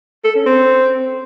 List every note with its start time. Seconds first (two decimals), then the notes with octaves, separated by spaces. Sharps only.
0.25 A4
0.35 C#4
0.46 C4